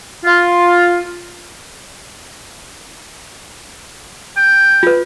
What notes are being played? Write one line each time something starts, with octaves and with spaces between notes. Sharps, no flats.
F4
G5
F4 B4